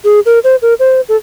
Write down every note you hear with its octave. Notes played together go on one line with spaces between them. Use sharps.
G#4
A#4
C5
A#4
C5
A4